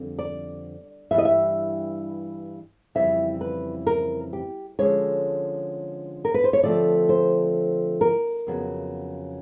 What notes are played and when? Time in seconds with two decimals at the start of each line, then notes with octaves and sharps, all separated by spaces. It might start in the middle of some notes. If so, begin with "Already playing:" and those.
Already playing: F2 D3 G3 C4
0.19 D5
1.11 G2 E3 G3 E5
1.18 D#5
1.25 E5
2.95 F2 C#3 E3 G3 C4 E5
3.41 B4
3.87 A#4
4.33 G4
4.79 D3 F3 G#3 C#4 C#5
6.25 A#4
6.34 B4
6.44 C5
6.53 C#5
6.63 D3 F3 A3 C4 D5
7.09 C5
8.01 A#4
8.47 F2 C#3 F#3 B3